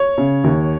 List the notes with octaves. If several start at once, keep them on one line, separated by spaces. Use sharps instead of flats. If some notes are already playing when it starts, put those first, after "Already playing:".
Already playing: C#5
C#3
D#2